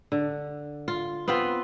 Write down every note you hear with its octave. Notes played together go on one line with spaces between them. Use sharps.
D3
F4
B3 C4 F4 B4